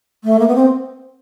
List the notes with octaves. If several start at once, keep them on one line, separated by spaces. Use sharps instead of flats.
A3
A#3
B3
C4